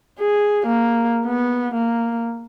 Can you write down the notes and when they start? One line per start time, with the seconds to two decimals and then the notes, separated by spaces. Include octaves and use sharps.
0.19 G#4
0.66 A#3
1.26 B3
1.74 A#3